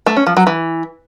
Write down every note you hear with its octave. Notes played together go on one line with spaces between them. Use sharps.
A3
C#4
F3
F#3
E3